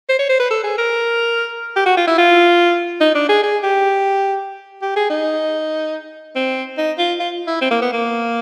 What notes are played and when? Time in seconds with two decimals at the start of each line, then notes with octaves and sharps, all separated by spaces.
0.09 C5
0.19 C#5
0.30 C5
0.40 B4
0.51 A4
0.64 G#4
0.78 A#4
1.76 G4
1.86 F#4
1.97 F4
2.08 E4
2.18 F4
3.01 D#4
3.15 D4
3.29 G#4
3.44 G#4
3.64 G4
4.82 G4
4.96 G#4
5.10 D#4
6.36 C4
6.78 D#4
6.98 F4
7.20 F4
7.47 E4
7.61 C4
7.71 A#3
7.82 B3
7.93 A#3